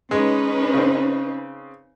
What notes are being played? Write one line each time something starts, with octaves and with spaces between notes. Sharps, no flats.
G#3 C#4 D#4 B4
C#3 C4